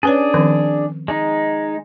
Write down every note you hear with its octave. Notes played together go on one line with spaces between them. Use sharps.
C#4 D4 G#4 B4 C#5
D#3 F3 C4
G#3 D#4